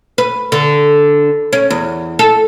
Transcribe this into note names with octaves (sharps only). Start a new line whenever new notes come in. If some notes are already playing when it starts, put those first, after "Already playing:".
B4
D3
C#4
E2
A4